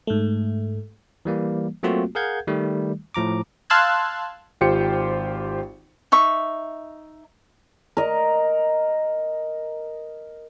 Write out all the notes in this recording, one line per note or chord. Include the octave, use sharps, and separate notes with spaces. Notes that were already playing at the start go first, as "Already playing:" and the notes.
G#2 A3
E3 G3 A#3
F#3 A3 A#3 C4 F4 F#4
G#4 A#4 F5 F#5 G6 G#6
D#3 G3 A3
A2 F3 A#5 D6
F5 A5 C6 E6 F#6 G#6
G#1 F4 G4 C5 G5 C#7
D#4 E5 C#6
A#4 D#5